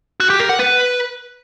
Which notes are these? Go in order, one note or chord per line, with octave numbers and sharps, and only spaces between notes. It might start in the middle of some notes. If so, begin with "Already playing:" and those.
F#4
G4
A#4
F#5
B4